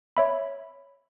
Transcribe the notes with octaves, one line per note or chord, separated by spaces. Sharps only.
C#5 E5 B5